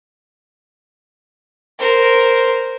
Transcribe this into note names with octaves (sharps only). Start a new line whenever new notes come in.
A#4 C5